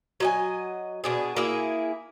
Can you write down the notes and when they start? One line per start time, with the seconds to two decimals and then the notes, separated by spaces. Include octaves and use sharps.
0.20 F#3 D#5 G#5
1.04 B2 D4 G#4
1.36 A#3 E4 G#4